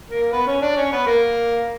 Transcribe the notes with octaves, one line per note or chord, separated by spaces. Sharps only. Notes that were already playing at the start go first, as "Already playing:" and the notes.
A#3 A#4
B3 B4
C#4 C#5
D4 D5
C#4 C#5
B3 B4
A#3 A#4